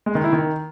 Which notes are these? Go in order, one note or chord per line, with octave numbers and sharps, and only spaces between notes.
G#3
D#3
E4
D#3